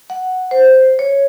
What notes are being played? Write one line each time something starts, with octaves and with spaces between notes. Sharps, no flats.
F#5
C5
C#5